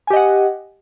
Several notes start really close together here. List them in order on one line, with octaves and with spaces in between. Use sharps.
G#5 G4 D#5 F#5